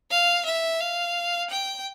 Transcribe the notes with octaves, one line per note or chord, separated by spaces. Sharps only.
F5
E5
F5
G5